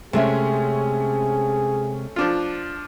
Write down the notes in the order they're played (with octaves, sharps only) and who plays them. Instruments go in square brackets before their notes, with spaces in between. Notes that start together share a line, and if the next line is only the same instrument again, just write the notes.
[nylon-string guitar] C3 G#3 E5 [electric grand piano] A3 C#4 [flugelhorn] G#4
[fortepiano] F3 D4 F4